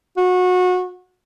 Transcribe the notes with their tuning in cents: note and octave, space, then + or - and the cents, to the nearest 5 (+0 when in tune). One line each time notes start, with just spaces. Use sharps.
F#4 -25